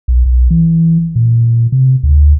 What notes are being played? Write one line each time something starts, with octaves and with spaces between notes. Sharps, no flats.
B1
B1
E3
A#2
C3
D2